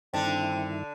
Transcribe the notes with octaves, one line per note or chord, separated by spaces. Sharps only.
G2 D3 D#3 C4 D4 E4